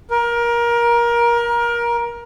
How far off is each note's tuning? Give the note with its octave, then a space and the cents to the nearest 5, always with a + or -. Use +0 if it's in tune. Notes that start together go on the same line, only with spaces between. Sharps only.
A#4 +25